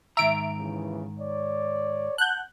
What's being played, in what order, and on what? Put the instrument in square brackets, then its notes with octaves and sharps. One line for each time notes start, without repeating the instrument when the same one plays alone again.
[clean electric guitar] G#2 D#3 A#5 [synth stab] E5 D7
[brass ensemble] D#2 C#3 E3
C#5 D5
[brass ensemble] F#5 A5 [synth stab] F#6 G6